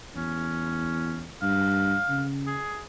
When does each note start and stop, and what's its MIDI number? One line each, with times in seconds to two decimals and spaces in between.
0.16 1.29 40
0.16 1.24 61
1.42 1.96 43
1.42 2.24 77
2.09 2.59 49
2.47 2.82 68